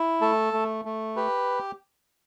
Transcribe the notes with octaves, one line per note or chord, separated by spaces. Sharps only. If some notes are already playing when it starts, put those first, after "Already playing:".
Already playing: E4
A3 A4
A3
A3
G4 B4